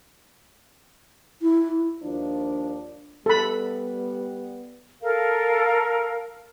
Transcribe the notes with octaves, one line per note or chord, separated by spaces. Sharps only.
E4
D#2 F3 D4
G3 B3 A4 B5
A4 A#4 F5